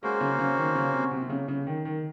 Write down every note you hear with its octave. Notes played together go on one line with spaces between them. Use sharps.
G#3 A#3 C#4 F#4 C5
C#3
C#3
D#3
C#3
C3
C3
C3
C#3
C#3
D#3
D#3